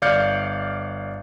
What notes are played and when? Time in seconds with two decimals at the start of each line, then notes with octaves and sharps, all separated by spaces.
0.02 G1 D5 F5 F6 G6 C#7